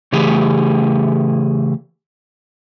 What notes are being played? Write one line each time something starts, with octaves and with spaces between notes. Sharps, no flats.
C#3 E3 A3 G4 G#4